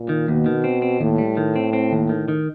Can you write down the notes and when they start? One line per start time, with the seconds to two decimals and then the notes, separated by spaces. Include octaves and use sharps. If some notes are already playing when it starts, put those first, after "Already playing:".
Already playing: A#2
0.09 D#3
0.28 D#2 B2
0.46 D#3
0.64 C4
0.82 C4
1.00 D#2 A2
1.18 G3
1.37 D#3
1.56 C4
1.73 C4
1.92 D#2
2.09 D#3
2.28 D#3